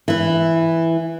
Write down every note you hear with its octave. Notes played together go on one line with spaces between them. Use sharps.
E3 E4